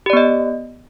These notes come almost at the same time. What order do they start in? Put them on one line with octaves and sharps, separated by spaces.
G4 D5 B3 D#5